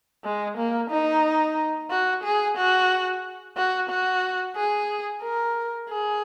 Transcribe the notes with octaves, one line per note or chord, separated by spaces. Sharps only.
G#3
A#3
D#4
F#4
G#4
F#4
F#4
F#4
G#4
A#4
G#4